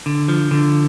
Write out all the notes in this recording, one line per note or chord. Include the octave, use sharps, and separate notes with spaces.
D3
F3
D3